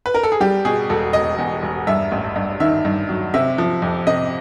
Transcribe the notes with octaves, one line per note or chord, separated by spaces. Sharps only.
B4
A#4
A4
G#4
G3 G4
B2 G#4
E1 A4
E1 D#5
E2
E1
G2 E5
A1
G2
D#3 E5
G2
F#3
C3 E5
F3
F2
C3 D#5